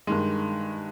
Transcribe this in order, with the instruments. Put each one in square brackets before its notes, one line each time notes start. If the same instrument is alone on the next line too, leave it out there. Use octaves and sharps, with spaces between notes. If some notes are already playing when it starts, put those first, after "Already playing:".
[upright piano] G2 D#3 G#3